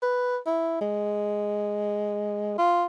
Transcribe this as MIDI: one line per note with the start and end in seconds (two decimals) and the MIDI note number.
0.02 0.37 71
0.46 0.79 64
0.81 2.57 56
2.58 2.86 65